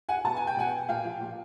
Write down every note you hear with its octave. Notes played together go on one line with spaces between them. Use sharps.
F#5 G#5
B2 A5
G#5
G5
B2 F#5 G#5
A#2 F5 G5
F3
A#2